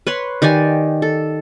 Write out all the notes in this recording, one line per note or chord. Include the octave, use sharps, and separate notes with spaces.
B4 C#5 C6
D#3 G4 D5 G#5
A4